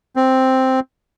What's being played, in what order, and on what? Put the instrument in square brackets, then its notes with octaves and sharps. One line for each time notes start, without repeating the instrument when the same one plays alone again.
[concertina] C4